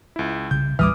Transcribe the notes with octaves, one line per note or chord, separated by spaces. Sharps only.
C#2 E4
C2 C#3 G6
A1 D#2 E3 G3 D6 D#6 F6